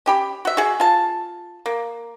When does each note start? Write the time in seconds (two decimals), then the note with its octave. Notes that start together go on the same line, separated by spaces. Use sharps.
0.06 C#4 G4 B5
0.45 F#4 E5
0.57 F#4 G#4
0.80 F4 A5
1.66 A#3